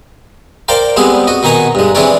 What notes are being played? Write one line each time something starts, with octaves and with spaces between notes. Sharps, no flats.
A#4 C5 D5 F5 G5 A5
G3 G#3 B3 C4 G#4
F#4 D#5
B2 D#3 D#4 G#5 A#5 C#6
G2 G#3
E3 G#3 C4 D4 C#5 D5